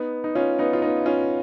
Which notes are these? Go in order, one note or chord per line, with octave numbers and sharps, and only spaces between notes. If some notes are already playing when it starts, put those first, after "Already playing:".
Already playing: B3 D#4
D#4
C#4 F4
B3 D#4
F4
B3 D#4
C#4 F4